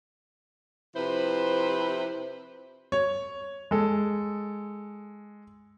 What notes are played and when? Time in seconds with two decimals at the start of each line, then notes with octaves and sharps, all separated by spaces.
0.95 C3 F3 E4 B4 C5
2.92 C#5
3.71 G#3 A4